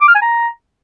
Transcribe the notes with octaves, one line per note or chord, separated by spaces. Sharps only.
D6
F6
G#5
A#5